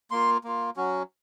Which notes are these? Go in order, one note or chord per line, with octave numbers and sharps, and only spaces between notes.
A#3 F4 C6
A#3 F4
F#3 C#4 F#4